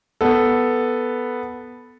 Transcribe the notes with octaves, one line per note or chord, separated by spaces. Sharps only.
B3 A4